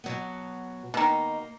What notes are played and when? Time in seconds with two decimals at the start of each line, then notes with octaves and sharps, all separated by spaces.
0.04 B2 F#3 B3
0.94 B2 D#3 A#3 D#4